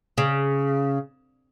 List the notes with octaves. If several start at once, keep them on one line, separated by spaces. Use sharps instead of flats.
C#3